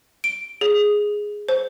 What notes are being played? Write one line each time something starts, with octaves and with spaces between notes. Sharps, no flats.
D7
G#4
C5